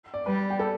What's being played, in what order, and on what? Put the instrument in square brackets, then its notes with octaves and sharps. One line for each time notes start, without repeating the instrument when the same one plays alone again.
[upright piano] D5
[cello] G3 [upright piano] B4
[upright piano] G4
A4